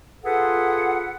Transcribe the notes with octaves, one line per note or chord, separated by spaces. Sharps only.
F4 G#4 A4 B4 F#5